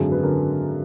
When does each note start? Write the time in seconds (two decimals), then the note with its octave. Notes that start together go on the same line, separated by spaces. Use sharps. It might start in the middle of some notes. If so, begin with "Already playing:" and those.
Already playing: G#1 F#2 D3 G#4
0.12 B4
0.23 D3 A#4